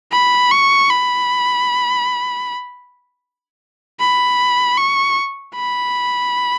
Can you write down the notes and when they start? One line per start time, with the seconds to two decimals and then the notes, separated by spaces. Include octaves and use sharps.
0.12 B5
0.51 C#6
0.90 B5
4.00 B5
4.78 C#6
5.56 B5